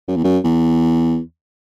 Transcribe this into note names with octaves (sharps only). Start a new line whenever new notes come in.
F#2
E2
F#2
E2